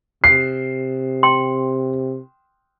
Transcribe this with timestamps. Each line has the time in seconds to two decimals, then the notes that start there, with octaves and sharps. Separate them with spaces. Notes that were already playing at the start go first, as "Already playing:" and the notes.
0.24 C3 C7
1.23 G5 C6